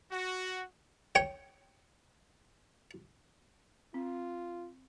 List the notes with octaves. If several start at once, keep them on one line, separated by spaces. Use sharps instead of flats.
F#4
C#5 G5
C4 F4